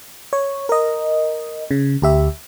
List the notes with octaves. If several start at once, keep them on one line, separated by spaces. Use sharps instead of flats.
C#5
A#4 D#5
C#3
D2 G4 E5